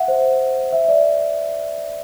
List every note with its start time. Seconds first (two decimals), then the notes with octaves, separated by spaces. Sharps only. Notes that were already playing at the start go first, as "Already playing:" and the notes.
Already playing: E5 F#5
0.08 C5
0.73 E5
0.88 D5